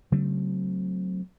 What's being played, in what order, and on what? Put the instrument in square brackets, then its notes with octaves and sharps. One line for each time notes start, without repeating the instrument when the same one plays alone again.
[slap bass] C#3 F#3 A3 C4